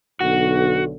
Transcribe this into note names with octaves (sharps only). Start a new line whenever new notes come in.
B1 D3 F#4